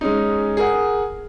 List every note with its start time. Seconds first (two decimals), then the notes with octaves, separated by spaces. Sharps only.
0.01 G#3 C#4 D#4
0.57 G#4 A#4 F#5